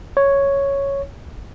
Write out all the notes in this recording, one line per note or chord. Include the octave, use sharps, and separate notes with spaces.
C#5